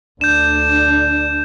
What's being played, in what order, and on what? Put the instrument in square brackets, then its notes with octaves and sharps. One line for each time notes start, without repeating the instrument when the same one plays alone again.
[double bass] D2 D4 [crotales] G6 E7